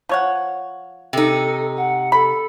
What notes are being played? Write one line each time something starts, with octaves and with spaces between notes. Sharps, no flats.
F3 C#5 F#5
C3 D#4 A4
F#5
A4 B5